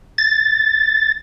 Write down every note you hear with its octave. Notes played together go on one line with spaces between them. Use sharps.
A6